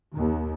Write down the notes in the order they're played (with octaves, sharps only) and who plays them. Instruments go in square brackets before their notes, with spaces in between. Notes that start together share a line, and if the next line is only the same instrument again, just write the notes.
[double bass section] D#2